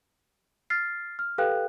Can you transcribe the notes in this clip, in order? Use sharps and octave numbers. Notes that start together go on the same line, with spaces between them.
F6 A6 C7
F6
G4 A4 B4 F5 G5 F#6